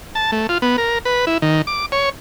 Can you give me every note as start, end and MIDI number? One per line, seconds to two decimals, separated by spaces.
0.15 0.31 81
0.32 0.47 57
0.49 0.58 65
0.62 0.76 59
0.78 0.98 70
1.05 1.25 71
1.27 1.38 64
1.42 1.62 51
1.67 1.86 86
1.92 2.09 73